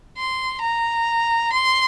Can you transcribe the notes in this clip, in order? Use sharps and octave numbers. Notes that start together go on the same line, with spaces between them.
C6
A#5
C6